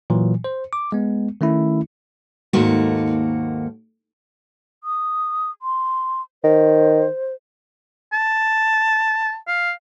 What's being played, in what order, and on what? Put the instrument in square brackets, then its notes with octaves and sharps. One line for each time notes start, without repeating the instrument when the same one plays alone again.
[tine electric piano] A#2 E3 F#3
C5
D6
G#3 B3
D#3 A3 C#4 E4
[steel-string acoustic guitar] D#2 G#2 A3 A#3 F#4
[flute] D#6
C6
[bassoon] D#3 [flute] C5
[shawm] A5
F5